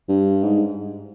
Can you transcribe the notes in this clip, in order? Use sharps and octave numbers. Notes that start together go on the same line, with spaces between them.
G2
G#2